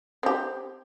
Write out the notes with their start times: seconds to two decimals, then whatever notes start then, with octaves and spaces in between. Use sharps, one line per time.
0.23 C4 G4